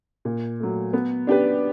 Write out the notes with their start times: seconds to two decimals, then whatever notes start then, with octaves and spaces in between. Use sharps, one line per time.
0.25 A#2
0.60 F#3 A3
0.93 B3
1.27 D4 G4 B4